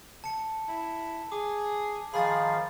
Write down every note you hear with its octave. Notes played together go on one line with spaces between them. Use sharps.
A5 C#7
E4
G#4 D6
D#3 F3 G#4 F5 B5 A6